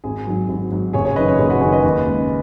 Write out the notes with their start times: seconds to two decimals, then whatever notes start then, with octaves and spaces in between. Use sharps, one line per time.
0.04 G#1 G#4
0.27 G#2 F#3
0.49 G#1
0.71 G#2 F#3
0.93 F#1 G#4 C#5
1.05 G#4 C#5
1.16 F#2 B4 D#5
1.20 D#3
1.27 G#4 C#5
1.39 F#1 G#4
1.50 F#4 B4
1.61 F#2 G#4 C#5
1.65 D#3
1.72 B4 D#5
1.83 D#2
2.06 C#3 G#3